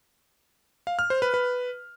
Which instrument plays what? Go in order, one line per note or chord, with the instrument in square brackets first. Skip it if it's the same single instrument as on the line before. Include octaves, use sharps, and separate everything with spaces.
[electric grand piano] F5
F6
C5
B4
B4